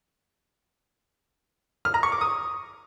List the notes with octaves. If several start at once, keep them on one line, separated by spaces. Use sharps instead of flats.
F6
A#5
C#6
D6
D#6